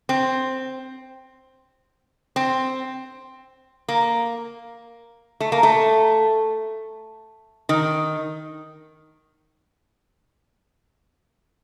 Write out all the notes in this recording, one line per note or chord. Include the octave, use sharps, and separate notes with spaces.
C4
C4
A#3
A3
A#3
A3
D#3